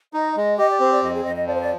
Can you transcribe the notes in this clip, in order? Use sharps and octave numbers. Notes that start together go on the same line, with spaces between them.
D#4 D#5
G#3 D#5
G4 D#5
D5
C4 C5
D5
F2 D#5
G#4
F2 D#5
D#5
F3 D5
C5
D5